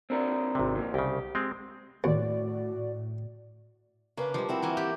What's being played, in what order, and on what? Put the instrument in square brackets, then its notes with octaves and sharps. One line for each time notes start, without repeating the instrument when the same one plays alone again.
[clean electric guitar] C4 D4 A#4
[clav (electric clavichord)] G#1 C3
[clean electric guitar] F2 A#3
[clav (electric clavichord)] C2 C#3 [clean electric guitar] G4
[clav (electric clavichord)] G#3 C4
[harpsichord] D#2 [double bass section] A2 [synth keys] F#4 D5
[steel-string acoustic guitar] C#3 B4 [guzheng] A#3 D4
[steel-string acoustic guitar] D3 G#3 [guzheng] F3 G3
[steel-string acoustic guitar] C4 E4 F#4
[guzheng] E3 A#3 G#5
G4